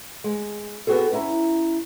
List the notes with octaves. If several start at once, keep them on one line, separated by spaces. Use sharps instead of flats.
G#3
B3 C4 F#4 G#4 A4
C#4 E4 E5 A5 A#5